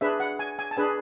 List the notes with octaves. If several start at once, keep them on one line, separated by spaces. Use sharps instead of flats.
D4 G#4 B4 E5
F#5
G#5
G#5
A5
D4 G#4 B4 G#5